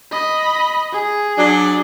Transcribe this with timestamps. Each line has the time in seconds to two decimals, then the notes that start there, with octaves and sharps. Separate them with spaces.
0.11 D#5 B5
0.93 G#4
1.37 F#3 D4